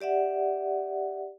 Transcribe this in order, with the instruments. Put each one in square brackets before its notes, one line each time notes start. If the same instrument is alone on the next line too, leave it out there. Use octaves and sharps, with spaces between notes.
[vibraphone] G4 D5 E5 F#5